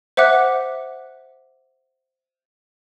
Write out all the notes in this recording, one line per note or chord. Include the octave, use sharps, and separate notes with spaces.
C5 E5 F#5 D6 F#6